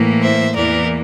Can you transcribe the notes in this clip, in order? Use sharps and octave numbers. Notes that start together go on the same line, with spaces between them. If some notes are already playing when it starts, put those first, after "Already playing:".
Already playing: A2 E3 A#3
C5 E5
E2 E3 A#3 A#4 D5